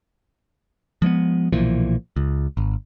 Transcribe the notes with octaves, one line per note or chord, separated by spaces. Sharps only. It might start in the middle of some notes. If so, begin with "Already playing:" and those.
F3 G#3 A#3 B3
B1 A#2 E3 F3
C#2
G#1